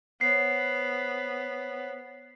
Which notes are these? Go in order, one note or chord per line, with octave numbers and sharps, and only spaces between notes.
B3 C5 C#5 F#5 C7